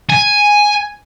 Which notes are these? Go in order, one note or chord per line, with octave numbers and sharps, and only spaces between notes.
G#5